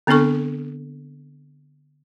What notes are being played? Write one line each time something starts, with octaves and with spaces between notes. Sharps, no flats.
D3 B3 C4 D4 A4 C#6